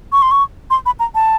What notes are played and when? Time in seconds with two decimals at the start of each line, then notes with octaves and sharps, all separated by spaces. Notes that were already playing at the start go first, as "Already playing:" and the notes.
0.12 C#6
0.22 C6
0.31 C#6
0.70 C6
0.86 B5
1.00 A#5
1.15 A5